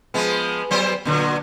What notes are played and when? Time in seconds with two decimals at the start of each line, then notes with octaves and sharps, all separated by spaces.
0.14 F3 G#3 B3
0.71 F#3 B3 C5
1.05 A#2 D3 F#3